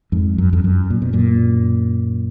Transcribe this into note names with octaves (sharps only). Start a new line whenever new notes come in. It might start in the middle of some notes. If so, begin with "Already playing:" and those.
F2 G#2
F#2
F2
F#2
A#2
B2
F#2 A#2